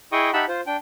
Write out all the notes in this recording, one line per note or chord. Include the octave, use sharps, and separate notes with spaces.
E4 G#4 D#5 G5 C#6 D#6
D#4 G4 E5 F#5 A5 B5
F4 C5
D4 G5